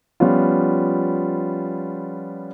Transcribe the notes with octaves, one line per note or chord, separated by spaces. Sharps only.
F3 G3 B3 C#4 F4